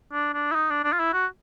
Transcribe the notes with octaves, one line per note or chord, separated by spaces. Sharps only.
D4
D4
E4
D#4
D4
D4
F4
E4
F#4